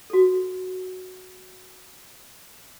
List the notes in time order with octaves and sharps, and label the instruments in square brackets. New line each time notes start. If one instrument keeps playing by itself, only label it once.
[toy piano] F#4 A4